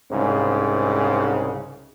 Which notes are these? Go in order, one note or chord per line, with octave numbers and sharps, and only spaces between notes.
C2 G#2 C#3